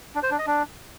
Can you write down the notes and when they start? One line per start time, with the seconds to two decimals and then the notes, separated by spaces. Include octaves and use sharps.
0.15 D4
0.23 C5
0.31 D4
0.39 D#5
0.47 D4